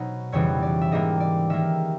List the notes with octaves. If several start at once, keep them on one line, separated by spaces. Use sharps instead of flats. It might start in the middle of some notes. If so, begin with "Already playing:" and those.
Already playing: B2 F#3 B3 D#4 C5
F2 C#3 E3 G3 B3 C#5
D5
E5
G#2 E3 G3 A#3 D#5
D5
D#3 G3 A#3 E5